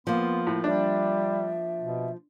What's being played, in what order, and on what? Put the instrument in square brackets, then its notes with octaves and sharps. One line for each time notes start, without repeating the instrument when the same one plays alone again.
[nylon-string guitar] F3 A#3 [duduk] B3 [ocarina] C6
[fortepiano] A2
[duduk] G3 [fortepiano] D4 [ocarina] E5
[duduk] B2